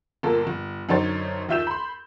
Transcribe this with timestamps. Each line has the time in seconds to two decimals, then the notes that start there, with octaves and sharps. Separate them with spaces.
0.23 G1 A#2 A#3 A4
0.47 G1
0.89 F#2 D3 D#4 C5 C#5 A6
1.49 D#2 F4 E5 G6 E7
1.67 B5 C6